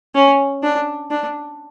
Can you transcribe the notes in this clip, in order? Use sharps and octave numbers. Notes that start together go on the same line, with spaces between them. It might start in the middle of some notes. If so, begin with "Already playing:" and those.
C#4
D4
D4